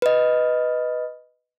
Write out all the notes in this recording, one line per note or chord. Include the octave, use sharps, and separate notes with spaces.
B4 D#5